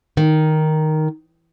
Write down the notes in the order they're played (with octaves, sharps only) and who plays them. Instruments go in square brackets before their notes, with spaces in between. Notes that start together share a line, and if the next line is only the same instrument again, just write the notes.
[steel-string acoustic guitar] D#3